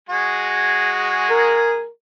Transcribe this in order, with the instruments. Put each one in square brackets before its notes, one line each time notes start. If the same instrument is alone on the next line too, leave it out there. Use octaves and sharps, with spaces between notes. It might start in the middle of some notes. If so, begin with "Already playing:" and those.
[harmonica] G#3 F#4 G#4
[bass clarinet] A#4